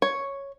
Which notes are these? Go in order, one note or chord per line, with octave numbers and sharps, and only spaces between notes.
C#5